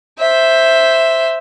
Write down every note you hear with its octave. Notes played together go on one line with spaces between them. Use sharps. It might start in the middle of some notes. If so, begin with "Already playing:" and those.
C5 E5